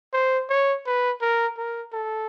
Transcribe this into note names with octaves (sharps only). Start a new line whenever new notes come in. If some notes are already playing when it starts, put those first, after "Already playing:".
C5
C#5
B4
A#4
A#4
A4